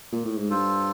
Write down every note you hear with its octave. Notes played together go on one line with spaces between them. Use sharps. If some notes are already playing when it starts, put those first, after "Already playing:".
A#2
A2
G#2
G2 F4 A4 C5